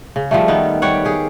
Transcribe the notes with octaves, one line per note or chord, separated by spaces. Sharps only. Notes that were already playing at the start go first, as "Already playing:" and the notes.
C#3
F3 G3 A3
D#3 B3
G3 G4 C#5 F#5
G4 G#4 F5